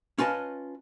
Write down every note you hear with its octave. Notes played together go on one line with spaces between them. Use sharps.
C#4 F4 B4 D#5 A5